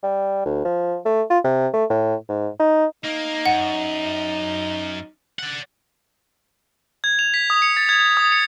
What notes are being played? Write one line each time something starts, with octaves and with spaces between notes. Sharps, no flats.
G3
D2
F3
A3
F4
C3
A3
A2
G#2
D#4
A#3 D#4
F#2 F#5
D5 F#5
G#6
F7
B6
D#6
C#7
A6
G#6
G#6
D#6
C#7